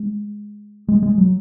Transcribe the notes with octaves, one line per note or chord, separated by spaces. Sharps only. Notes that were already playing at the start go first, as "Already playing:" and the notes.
Already playing: G#3
G#3
G#3
F#3